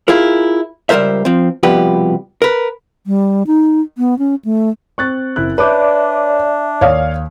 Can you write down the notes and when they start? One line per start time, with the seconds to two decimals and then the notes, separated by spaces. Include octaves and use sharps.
0.08 E4 F4 G#4 A#4
0.89 C#2 G3 G#4 A#4 C5 E5
1.25 F3 C4
1.63 C2 B2 F3 G4 B4
2.42 A#4 B4
3.07 G3
3.47 D#4
3.98 B3
4.19 C#4
4.45 A3
4.98 C4 C#6 F#6 A6
5.36 F#1 E4 F#6
5.58 D4 B4 C#5 D5 E5 D6 G6
6.81 D#2 C#5 D5 F5 D#6